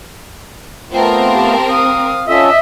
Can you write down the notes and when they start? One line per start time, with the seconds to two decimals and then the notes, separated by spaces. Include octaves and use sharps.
0.92 A3 B3 C4 F4 A#4
1.33 G4 A5
1.70 F5 D#6
2.28 C#4 F4 A4 D#5 E5